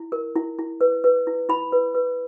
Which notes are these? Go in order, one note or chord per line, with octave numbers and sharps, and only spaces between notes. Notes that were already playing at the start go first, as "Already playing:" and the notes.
Already playing: E4
A#4
E4
E4
B4
B4
E4
E4 B5
B4
B4